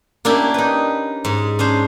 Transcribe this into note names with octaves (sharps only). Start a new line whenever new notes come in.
A#3 C#4 D4 E4 G4
D#4 B4
G#2
C#4 D4 C5